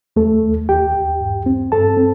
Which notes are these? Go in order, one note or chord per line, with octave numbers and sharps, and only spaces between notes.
D#2 A3 A4
D#2
D#2 G4 G5
D#2
G2
C4
G2 A4 A5
C4